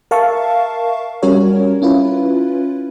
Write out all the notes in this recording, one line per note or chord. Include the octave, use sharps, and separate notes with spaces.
A#4 E5 F5 A5 C#6
G3 C#4 F#4 A#4 C#5
C#4 E4 F4 B4